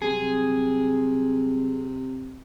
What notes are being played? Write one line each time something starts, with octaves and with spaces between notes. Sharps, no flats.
C3 F#3 G3 C4 G#4